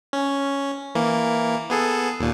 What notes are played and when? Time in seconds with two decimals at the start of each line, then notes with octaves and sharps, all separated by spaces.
0.13 C#4
0.95 E3 A#3
1.70 B3 G#4 A4
2.20 D#2 A#2